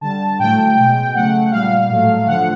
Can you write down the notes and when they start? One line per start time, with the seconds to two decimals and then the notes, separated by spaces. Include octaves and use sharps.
0.01 D3 G3 A5
0.39 A2 F#3 A3 G5
0.77 B2 G#3
1.15 C#3 F#3 A3 F#5
1.51 A#2 G3 F5
1.89 A2 F#3 A3
2.27 D3 F3 A3 F#5